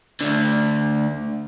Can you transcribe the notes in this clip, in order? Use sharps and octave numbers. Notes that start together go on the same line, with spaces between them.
D2 D3